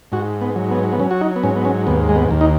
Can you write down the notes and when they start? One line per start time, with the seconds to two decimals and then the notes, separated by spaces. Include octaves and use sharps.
0.12 G#2 F#4
0.41 B3
0.56 F#3
0.71 B3
0.93 B3
1.00 F#3 C#4
1.11 F#4
1.21 D#4
1.36 B3
1.43 G#2 C#4
1.56 B3
1.65 C#4
1.87 D#2 B3
2.09 G#3
2.16 B3
2.31 D#2
2.41 D#4